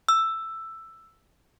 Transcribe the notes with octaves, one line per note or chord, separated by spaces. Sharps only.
E6